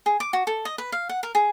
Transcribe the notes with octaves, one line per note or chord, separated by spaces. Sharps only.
G#4
D6
F#4
A4
D#5
B4
F5
F#5
A#4
G#4